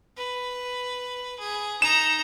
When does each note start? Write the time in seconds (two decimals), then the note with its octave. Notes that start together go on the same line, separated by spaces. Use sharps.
0.17 B4
1.39 G#4
1.82 D#4 A#5 E7